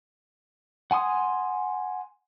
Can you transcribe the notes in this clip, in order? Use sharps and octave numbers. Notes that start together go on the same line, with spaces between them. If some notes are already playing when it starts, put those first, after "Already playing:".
F#5 G#5 C6 D#6